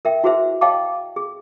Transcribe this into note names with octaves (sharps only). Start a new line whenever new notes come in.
A#4 E5 G5
E4 F#4 G#4 B4 C5 E5
C#5 D#5 F5 G5 A5 D6
G#4